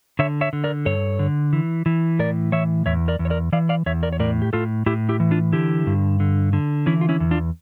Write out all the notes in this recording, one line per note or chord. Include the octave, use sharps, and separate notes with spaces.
D3 C#5 E5
C#5 E5
D3
A#4 D5
G2 A4 C#5
D3
E3
E3
A2 A#4 D5
E3 C#5 E5
E2 C#5 E5
A#4 D5
E2
C#5
A#4 D5
E3 D5 F5
D5 F5
E2 C#5 E5
A#4 D5
C#5
A2 A#4 D5
G4
A2 F4 A4
A2 E4 G4
E4 G4
E3
D4 F4
D3 E4 G4
G2
D3
D3
E3 C#4 E4
F4
C#4 E4
E2
D4 F4